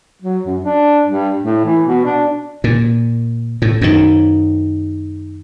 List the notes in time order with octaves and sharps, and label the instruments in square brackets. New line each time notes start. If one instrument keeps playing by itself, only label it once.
[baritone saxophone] F#3
F#2
D4
G2
A2
E3
B2
D4
[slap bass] A#2
A2
F#2 D#3